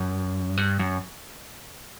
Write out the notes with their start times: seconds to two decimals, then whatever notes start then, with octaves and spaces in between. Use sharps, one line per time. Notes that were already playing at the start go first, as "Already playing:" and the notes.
Already playing: F#2
0.57 G2
0.79 F#2